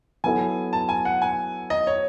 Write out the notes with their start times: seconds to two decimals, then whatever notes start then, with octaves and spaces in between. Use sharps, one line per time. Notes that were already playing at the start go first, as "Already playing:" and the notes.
0.24 F#3 B3 E4 A4 G#5
0.73 A5
0.89 G#5
1.05 F#5
1.22 G#5
1.70 D#5
1.87 C#5